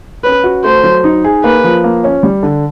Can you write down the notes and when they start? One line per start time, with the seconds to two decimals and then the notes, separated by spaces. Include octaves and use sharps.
0.24 C#4 B4
0.44 F#4
0.64 A3 C5
0.83 F#3
1.04 D#4
1.24 G#4
1.44 A#3 B4
1.64 F3
1.84 A#3
2.04 C#4
2.23 G3
2.43 D3